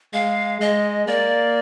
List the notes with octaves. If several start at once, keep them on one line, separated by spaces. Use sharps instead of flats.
G#3 F5
G#3 D#5
A#3 D5